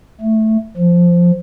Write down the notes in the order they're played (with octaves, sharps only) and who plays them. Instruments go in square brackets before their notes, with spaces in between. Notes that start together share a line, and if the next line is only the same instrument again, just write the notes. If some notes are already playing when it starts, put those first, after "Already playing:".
[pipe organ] A3
F3